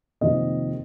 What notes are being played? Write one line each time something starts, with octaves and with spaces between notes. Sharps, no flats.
F2 C3 D#3 A#3 D#5